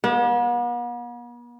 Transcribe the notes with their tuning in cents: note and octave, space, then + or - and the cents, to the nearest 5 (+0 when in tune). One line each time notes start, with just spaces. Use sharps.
B3 -45